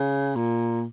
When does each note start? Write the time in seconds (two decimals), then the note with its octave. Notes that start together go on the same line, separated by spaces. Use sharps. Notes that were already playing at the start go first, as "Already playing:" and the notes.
Already playing: C#3
0.35 A#2